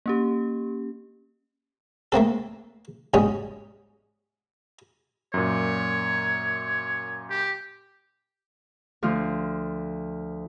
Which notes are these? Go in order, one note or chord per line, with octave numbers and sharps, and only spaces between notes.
A#3 C#4 G4
A3 A#3 C4 A4
B1 G#2 G3 C#4 D#6
F#2 A#2 C#5
G4
D2 F3 F4